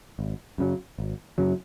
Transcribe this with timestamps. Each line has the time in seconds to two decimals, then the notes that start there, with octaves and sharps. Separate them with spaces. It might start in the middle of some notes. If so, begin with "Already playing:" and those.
0.19 G#1
0.58 F#2 C#3 F#3
0.98 G#1
1.38 F#2 C#3 F#3